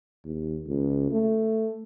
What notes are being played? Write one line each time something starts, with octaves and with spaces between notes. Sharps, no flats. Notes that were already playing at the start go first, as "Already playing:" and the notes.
D#2
C#2
A3